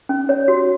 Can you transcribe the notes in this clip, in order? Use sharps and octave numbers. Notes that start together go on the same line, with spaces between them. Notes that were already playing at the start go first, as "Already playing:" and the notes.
C#4
C#5
F#4